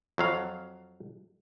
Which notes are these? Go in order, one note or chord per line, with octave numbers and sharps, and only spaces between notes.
F2 F#3 F5